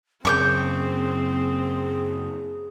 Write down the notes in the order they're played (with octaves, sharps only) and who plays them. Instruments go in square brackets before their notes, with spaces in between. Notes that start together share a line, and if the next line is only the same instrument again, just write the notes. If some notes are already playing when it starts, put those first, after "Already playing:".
[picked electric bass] F#2 C#3 [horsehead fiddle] C4 [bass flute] G#4 [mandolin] C#6 D6 G6